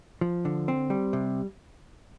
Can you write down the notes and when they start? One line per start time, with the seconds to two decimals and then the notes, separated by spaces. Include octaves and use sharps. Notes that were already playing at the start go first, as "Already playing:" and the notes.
0.21 F3
0.45 D3
0.68 C4
0.90 G3
1.13 C3